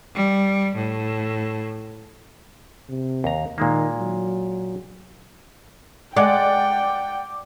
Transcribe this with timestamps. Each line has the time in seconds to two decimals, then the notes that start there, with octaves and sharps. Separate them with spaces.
0.15 G3
0.75 A2
2.89 C3
3.24 D#2 A#5
3.58 A#2 D#3 G#3 A#3
3.99 F#3
6.16 G#3 D5 F#5 G5 D6